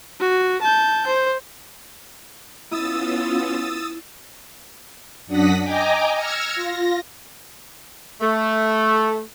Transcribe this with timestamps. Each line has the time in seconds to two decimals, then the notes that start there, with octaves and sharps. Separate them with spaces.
0.20 F#4
0.62 A5 G6
1.07 C5
2.71 B3 C#4 E4 F4 D#6 E6 A6
5.27 F#2 D4 F#5 D#6 A#6 B6
5.63 D#5 G5 G#5 A#5 D6
6.14 E6 F6 G#6 A#6 C#7
6.55 F4 A#6
8.21 A3